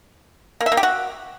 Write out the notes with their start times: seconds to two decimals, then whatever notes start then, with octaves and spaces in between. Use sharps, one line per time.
0.61 A#3
0.66 E5
0.72 A#3
0.77 G4
0.83 F#4